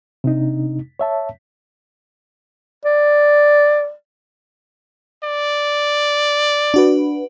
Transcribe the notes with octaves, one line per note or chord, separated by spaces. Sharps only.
C3 D4 D#4
C#5 E5 A5
D5
D5
D4 F#4 B4